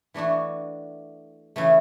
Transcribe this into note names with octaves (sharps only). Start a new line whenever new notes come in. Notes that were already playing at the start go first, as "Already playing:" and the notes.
E3 A3 D4 F#4
C#3 E3 A3